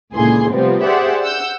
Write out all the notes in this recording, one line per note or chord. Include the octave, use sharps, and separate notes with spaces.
C#2 A#2 D3 E3 G#4 C6
C3 F3 G3 A3 B3 C4
G4 G#4 C5 D5 E5 F#5
F#5 E6 G6